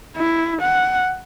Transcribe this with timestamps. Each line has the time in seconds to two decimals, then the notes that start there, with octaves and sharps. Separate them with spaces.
0.17 E4
0.61 F#5